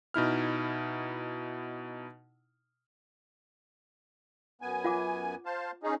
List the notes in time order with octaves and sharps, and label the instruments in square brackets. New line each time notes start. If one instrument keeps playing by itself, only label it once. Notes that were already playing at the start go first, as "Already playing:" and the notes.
[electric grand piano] B2 D#4 E4 F6
[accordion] F#2 B3 G#5
[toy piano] F4 F#5 D6
[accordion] C5 F5 A5
C#4 D#4 G#4